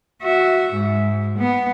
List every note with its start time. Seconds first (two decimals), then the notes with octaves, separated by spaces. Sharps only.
0.23 F#4 E5
0.74 G#2
1.38 B3